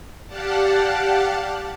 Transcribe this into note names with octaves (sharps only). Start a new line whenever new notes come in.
G4 D5 F5 F#5 A5